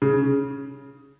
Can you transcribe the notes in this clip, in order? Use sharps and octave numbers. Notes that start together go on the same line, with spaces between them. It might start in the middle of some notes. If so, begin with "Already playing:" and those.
C#3